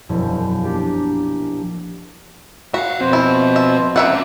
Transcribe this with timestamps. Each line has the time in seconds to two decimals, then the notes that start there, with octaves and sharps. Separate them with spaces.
0.09 E1 A#1 F#2 F3 E4 B5
0.64 A#3 D4 F4 G4
2.74 F#4 E5 F5
3.01 B2 F3 C4 C5
3.13 E4
3.56 E5
3.96 A#3 C#4 D#5 E5 F#5